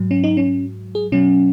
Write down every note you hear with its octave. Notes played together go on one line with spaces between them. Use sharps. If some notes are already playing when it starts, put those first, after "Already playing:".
Already playing: G#2 F#3
C#4
D#4
C#4
G#4
B2 F#3 C#4